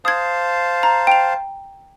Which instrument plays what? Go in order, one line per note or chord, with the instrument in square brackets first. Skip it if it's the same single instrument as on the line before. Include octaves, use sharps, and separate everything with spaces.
[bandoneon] C5 F5 A5 [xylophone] D#6 G#6
[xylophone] A#5
G5 F7